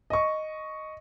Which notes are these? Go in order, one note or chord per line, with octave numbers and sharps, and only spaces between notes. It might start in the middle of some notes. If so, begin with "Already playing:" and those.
D#5 C#6